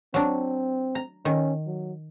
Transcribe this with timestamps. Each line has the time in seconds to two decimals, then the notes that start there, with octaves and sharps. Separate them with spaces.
0.14 F#3 C4 D4
0.95 A#5
1.25 D#3 C#4
1.66 F#3